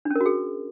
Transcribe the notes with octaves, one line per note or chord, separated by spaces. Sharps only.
D4
C#4
A#4
F#4
G#4